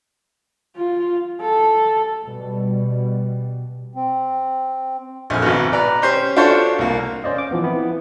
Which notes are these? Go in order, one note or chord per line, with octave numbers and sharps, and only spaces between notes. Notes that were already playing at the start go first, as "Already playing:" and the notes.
F4
A4
B2 G3
C4
A#1 F2 F6
G#1 B2
B4 D5 A#5
C#4 G4 C5
D4 F4 F#4 A4 C5 C#5
C2 A#3
C#4 C5 D5 D#5
F5 D6
E3 F3 B3
B3 C4 E4